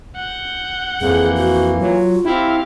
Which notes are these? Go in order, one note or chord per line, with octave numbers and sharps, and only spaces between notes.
F#5 G6
F2 E3 A#3 G#4
F#4
F#3 F4
C4 E4 G4 F5